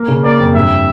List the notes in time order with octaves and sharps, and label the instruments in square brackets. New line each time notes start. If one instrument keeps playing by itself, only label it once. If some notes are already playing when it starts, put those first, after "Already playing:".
Already playing: [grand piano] A#3
C#3
[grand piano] A#3 [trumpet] D5
[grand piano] F2
[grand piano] G2 [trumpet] E5